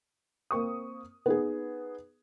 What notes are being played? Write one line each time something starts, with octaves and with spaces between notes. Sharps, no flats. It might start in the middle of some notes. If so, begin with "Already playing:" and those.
A#3 C4 C#6 D#6
B3 D#4 G#4